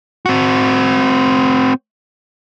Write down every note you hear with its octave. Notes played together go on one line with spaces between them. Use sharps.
C4 F#4